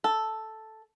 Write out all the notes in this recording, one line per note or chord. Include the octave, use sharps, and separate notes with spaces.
A4